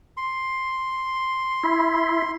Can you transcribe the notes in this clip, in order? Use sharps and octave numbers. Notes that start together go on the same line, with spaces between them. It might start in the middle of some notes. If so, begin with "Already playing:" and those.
C6
E4